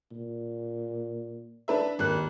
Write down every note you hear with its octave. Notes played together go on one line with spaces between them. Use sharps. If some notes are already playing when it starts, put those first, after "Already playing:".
A#2
D4 B4 E5
G#1 D#2 F#6